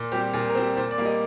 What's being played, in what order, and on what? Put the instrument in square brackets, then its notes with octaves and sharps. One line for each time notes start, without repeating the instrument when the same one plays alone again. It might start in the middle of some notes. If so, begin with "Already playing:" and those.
Already playing: [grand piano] A#2
G3 C4 G4
A#2 G#4
A#4
G3 C4 C5
A#2 C5
D5
G3 A#3
D#5